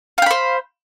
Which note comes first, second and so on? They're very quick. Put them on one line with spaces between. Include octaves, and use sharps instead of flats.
F5 G5 B5 C5